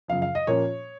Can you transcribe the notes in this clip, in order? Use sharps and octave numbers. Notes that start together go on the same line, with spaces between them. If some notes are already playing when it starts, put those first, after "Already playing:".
F#2 C#3 F3 F5
F5
D#5
A#2 F3 A#3 C#4 C#5